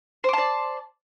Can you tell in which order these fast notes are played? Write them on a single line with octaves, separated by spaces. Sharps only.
C5 D6 A5 D5